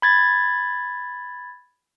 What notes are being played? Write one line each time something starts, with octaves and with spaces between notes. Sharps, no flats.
B5 G#6 A6